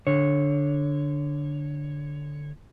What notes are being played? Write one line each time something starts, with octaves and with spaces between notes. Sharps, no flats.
D3 C#5